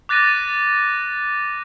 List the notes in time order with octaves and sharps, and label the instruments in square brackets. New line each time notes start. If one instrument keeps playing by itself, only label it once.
[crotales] D6 F#6 A6 A#6 D#7